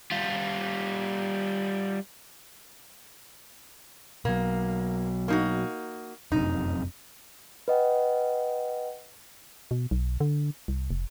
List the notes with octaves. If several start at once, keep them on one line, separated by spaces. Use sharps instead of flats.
G3 F4
B2 F#3 A#3
A#3 D#4 F#4
F1 F#2 C3 D#4
B4 D#5 F#5 G5
B2
B1
D3
C2
F1